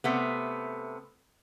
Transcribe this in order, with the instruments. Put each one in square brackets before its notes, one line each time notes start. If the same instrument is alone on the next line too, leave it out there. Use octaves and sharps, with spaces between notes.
[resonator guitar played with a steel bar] C3 A3 B3